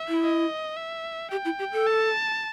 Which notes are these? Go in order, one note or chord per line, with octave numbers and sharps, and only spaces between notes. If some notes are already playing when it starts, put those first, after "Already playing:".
Already playing: E5
E4
D#5
E5
G4 G5
E4
G4
A4
A5